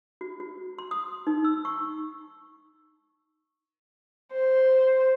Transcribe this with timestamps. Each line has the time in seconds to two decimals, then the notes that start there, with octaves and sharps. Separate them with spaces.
0.21 F#4
0.40 F#4
0.79 C6
0.91 D#6
1.27 D#4
1.44 E6
1.65 C#6
4.32 C5